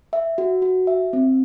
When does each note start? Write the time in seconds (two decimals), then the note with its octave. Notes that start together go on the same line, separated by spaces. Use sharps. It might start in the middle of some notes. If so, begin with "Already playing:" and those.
0.13 E5
0.38 F#4
0.62 F#4
0.87 E5
1.13 C4